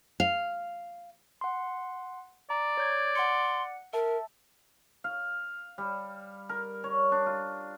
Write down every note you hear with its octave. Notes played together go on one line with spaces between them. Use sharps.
F5
F#5 C6
D5 A#5
C#5 G6 G#6
F#5 C6 C#7
A#4 E5 A5
F5
G3
A#4
C#5
D4
F4